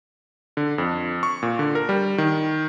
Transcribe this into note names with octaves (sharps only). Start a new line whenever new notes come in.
D3
F2
C#6
A#2
D3
A#4
G3
D#3